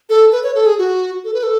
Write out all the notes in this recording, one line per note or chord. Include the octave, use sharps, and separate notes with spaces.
A4
B4
C#5
A4
G#4
F#4
A4
B4
A4